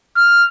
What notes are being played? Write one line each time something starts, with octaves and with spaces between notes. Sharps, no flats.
F6